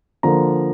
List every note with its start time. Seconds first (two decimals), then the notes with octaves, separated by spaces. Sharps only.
0.23 D3 F3 A#3 A#5